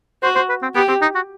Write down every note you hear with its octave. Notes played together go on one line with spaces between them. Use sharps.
F#4 C5
C5
B4
C4
B3 G4
C4
D#4
F#4